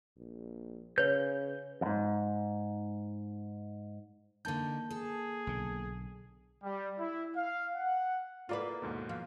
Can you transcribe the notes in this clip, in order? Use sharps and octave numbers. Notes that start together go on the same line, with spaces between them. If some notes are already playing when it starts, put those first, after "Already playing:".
A#1
C#3 B4 C#5 G6
F2 G#2
D3 A#3 D#4 A5 G6
G#4 A4
B1 D3
G3
E4
F5
F#5
A#3 E4 F4 A4 B4 D5
D#2 G#2 B2
F3 F5